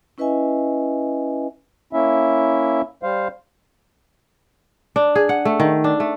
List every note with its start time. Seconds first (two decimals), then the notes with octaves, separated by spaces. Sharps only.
0.18 C#4 E4 B4 D#5 E5 G#5
1.93 A#3 C#4 E4 E5
3.03 G3 C5 F5
4.96 D4
5.16 G#4
5.29 F#5
5.45 A3
5.60 D#3
5.84 D4
6.00 A3